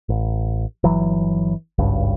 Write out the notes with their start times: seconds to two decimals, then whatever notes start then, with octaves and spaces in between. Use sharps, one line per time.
0.09 A1
0.84 G1 E3 F#3
1.78 G#1 C#2 G2